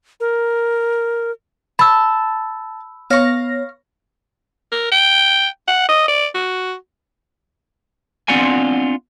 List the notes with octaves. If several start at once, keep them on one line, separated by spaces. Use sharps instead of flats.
A#4
A5 B5 E6
B3 C#5 F5 C#6 A#6
A#4
G5
F#5
D#5
D5
F#4
B3 C4 D4 F4 F#5 G#5